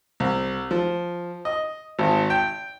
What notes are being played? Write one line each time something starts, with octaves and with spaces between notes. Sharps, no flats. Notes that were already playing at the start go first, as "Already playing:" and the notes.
C2
F3
D#5
G#1
G5